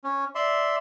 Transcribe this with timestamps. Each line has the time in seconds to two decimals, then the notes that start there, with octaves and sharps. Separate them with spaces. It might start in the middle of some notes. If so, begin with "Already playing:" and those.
0.04 C#4
0.35 D5 E5 C6